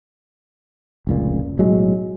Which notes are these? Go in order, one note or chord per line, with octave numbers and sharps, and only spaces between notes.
F1 C#2 A#2
B1 A2 F#3 G#3